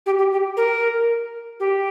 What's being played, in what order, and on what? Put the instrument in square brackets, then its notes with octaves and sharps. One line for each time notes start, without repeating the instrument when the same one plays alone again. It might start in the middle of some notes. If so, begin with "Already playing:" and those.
[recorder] G4
G4
G4
A#4
G4